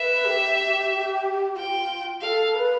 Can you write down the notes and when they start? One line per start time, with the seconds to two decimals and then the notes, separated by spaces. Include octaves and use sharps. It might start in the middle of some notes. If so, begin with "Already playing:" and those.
Already playing: B4 E5
0.25 G4
1.56 F4 G5
2.21 A4 F5
2.55 B4